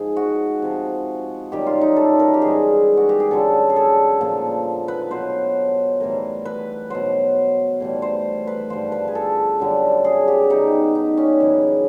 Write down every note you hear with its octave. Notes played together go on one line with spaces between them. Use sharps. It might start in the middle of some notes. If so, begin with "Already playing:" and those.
Already playing: G#2 F3 G#4
F#4
C3 F3
F#2 D#3 G3 G4
F4
D#4
A4
A#4
G4
G#2 E3 G3 G#4
F#4
G4
G#4
F#2 D3 G3 A4
G#4
A4
A#2 F3
B4
B2 F#3 C5
A2 E3 G3 A#4
B4
B2 F#3 C5
A2 E3 G3
C5
B4
G2 D3 F3 C5
B4
G#4
A4
F#2 D3 G3
G#4
G4
B2 G3 D#4
D#4
C#4
F#2 C#3 E3